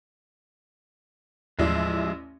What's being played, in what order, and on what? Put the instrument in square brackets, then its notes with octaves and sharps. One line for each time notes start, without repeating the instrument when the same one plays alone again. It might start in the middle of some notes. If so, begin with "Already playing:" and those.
[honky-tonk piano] A1 E4 D5 [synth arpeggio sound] D#2 [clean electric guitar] F3 G#3